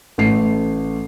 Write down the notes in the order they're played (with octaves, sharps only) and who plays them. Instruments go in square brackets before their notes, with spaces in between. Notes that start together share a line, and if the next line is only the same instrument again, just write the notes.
[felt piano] A1 A3 C7